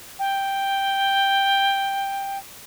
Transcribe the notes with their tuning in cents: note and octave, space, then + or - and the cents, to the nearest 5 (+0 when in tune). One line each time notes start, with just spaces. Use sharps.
G5 +5